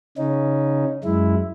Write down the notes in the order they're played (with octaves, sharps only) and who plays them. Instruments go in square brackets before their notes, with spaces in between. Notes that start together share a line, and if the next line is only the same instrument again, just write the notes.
[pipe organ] C#3 C#4 D#4
F#2 G#3 E4